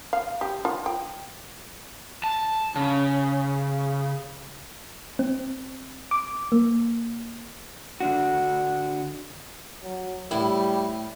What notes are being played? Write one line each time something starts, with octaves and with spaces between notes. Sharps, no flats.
F5
G4
F4
G5
A5
C#3
C4
D6
A#3
D3 D4 F#4
F#3
A2 G3 E4